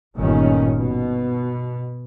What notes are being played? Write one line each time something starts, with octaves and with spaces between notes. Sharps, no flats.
G1 A#2 D#3 C#4
B2